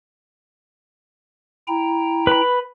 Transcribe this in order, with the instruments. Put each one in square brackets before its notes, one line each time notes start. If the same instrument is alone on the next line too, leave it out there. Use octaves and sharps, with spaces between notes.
[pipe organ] E4 G5 A#5
[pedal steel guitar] B4 B5